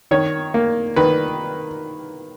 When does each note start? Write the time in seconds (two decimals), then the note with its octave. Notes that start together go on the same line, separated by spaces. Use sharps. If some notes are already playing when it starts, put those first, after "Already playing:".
0.11 D#3 C#5
0.54 A#3
0.96 D#3 B4